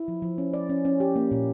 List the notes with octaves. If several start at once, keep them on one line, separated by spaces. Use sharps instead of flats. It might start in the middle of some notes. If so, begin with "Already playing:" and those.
Already playing: E4
F3
F3
C#4
D5
C#4
C#4
G4
A#3
A#2